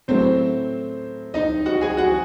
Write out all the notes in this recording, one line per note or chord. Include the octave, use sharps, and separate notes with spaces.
A2 F#3 A3 C4 C5
D#4 D#5
F#4 F#5
G#4 G#5
F#4 F#5